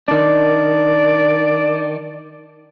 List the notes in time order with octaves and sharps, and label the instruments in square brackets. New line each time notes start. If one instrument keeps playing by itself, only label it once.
[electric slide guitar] D#3 D4 [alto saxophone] D5